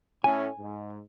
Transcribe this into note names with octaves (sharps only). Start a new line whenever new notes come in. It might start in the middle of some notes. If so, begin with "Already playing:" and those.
A2 C#4 G#5
G#2